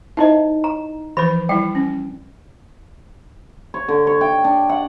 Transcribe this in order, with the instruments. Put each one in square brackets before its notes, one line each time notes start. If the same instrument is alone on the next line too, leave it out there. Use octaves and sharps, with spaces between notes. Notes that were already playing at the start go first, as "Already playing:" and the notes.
[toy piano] D#4 E4 D#5 [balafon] C5 E5
[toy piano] A#5
[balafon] E3 F3 B4 [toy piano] B5
[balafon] G3 E4 [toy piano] G5
[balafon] C#4
[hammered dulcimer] C#5
D3
C#5
G5
D4
F#5